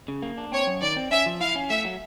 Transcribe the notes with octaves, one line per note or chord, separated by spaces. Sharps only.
C#3
A#3
D4
C4 C#5
F#2
D#3 D5
C4
C#4 E5
F3
E4 F5
C#4
A3 E5
F#3